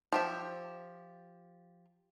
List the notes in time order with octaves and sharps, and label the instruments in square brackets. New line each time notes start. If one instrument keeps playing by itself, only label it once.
[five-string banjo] F3 G4 E5